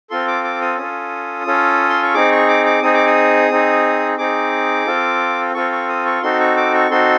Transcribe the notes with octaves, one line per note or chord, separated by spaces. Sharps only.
C4 F4 A4 C6
D6
D6
D#6
C#4 F4 A4 D#6
C#4 F4 A4
C6
C#6
C4 D#4 G#4 D6
C#6
D6
D6
C4 D#4 G#4 D#6
D6
D#6
C4 D#4 G#4
C4 D#4 G#4 D6
C4 F4 A4
C4 F4 A4 C#6
C#6
D#6
C#6
C4 D#4 F#4 A4 C6
C#6
D6
C#6
C4 D#4 F#4 A4 C6